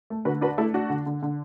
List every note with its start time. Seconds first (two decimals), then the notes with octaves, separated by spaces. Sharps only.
0.10 A3
0.25 D3 F#4 B4
0.41 D4 F#4 B4
0.58 A3 E4 A4
0.74 D4 F#4
0.90 D3
1.06 D3
1.23 D3